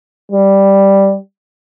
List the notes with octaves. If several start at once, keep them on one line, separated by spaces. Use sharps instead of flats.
G3